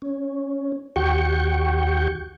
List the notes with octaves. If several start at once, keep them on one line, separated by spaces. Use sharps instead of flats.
C#4
D#2 F#4 G4 G5 C#6